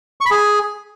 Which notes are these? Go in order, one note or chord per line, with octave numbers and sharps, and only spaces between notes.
C#6
B5
G#4